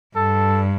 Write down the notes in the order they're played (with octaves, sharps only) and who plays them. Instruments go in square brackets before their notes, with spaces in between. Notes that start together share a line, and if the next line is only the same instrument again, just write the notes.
[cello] G2 [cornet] A4